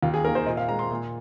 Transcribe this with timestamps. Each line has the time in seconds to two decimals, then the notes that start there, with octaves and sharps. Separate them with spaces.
0.03 D#2 F4
0.14 G#4
0.25 D#3 A#3 A#4
0.35 C5
0.46 A#2 D#5
0.57 F5
0.68 G#3 A#5
0.79 C6
0.90 A#2